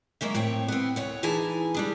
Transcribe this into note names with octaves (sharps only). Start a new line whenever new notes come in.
F#3 G#3 A#3 C#4 E5
A2 C4 C#5 G5
B3 C4
D2 C#5 F#5
E3 D#4 E4 G#4 G#5 A5
G3 D4 G#4